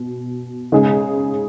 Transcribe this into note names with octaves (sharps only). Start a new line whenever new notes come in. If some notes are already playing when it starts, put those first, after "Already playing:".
Already playing: B2
C#3 G#3 D#4 G#4